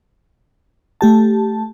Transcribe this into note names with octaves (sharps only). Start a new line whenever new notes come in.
A3 G4 A5